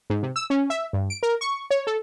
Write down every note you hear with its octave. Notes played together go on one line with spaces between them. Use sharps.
G#2
C3
E6
C#4
E5
G2
D7
A#4
C#6
C#5
A4